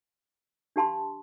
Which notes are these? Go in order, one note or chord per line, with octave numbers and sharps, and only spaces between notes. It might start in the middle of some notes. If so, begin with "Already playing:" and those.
D4 G4 F5 A5 C6